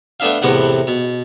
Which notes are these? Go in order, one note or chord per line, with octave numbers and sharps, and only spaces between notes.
A3 B3 D4 E5 F5
E2 A2 C3 B3 F#5
B2